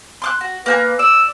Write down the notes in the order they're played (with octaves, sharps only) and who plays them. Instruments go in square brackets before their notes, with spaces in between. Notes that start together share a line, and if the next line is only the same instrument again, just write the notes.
[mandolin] C6 D6 F#6
F#4
[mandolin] A#3 G5 G#5 [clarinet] B4
[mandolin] D5 [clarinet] E6